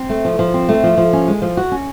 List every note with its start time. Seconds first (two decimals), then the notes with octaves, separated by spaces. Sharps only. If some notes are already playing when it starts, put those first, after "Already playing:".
Already playing: C4
0.09 A3
0.25 F3
0.39 F3
0.54 C4
0.69 A3
0.83 F3
0.97 F3
1.13 C#4
1.28 G#3
1.42 F3
1.57 F#4
1.72 C#4